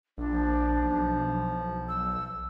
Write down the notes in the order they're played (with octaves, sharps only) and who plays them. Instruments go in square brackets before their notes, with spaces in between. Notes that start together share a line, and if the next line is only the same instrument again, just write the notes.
[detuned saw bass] A#1 [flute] D4
[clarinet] F3
[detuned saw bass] B1
[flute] E6